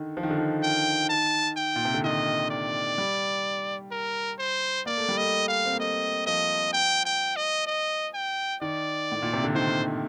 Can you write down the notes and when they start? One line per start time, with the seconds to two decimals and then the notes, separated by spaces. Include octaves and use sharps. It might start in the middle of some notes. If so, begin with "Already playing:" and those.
Already playing: D3 D#3
0.17 F3
0.23 D#3
0.30 D3
0.38 D#3
0.63 G5
1.10 A5
1.57 G5
1.76 A#2
1.85 C3
1.94 D3
2.04 D#3 D#5
2.50 D5
2.98 G3
3.91 A#4
4.39 C5
4.86 A#3 D5
4.98 A3
5.09 G3
5.17 A3 D#5
5.48 F5
5.65 C4
5.73 A#3
5.80 A3 D#5
6.26 F3 D#5
6.73 G5
7.06 G5
7.36 D#5
7.67 D#5
8.14 G5
8.61 D#3 D5
9.12 A2
9.22 A#2
9.33 C3
9.44 D3
9.55 D#3 C5